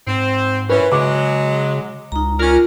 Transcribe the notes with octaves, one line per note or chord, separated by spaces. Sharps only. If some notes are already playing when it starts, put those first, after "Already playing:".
G#2 C4
E3 C#4 B4
C#3 F#3 G#3 D6
C#2 D#4 A#5
C#4 D4 F4 A#4